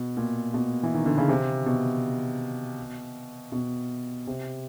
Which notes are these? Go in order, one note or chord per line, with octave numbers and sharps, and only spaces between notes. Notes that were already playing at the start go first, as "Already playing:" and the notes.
Already playing: B2
A#2
B2
E3
D#3
D3
C#3
C3
B2
B2
C3